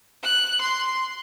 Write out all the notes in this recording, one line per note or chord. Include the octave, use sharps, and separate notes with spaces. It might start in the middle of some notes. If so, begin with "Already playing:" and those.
F#6
C6